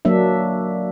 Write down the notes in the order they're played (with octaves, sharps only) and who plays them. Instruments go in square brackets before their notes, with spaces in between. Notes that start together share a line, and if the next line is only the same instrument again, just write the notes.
[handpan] F#3 A#3 D4 E5